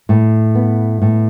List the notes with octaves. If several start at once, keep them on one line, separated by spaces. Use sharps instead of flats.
A2
B3
A2